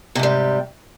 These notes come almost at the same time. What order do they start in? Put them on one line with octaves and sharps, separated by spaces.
C3 G#2 G3